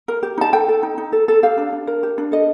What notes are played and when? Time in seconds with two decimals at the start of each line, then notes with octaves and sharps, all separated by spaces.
0.08 A#4
0.23 G4
0.38 D#4 A5
0.53 A4 G5
0.68 A4
0.83 D#4
0.98 D#4
1.12 A4
1.28 A4
1.43 G4 F5
1.58 D4
1.73 D4
1.87 A#4
2.03 G4
2.18 D4
2.32 A4 D#5